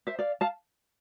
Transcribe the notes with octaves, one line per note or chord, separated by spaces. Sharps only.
C5 E5
D5 F5
F5 A5